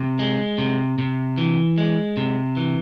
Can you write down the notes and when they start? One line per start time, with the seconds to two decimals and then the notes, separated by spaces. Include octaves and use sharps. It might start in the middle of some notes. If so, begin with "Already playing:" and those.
Already playing: C3
0.19 G#3
0.58 C3
0.98 C3
1.38 E3
1.78 G#3
2.17 C3
2.57 E3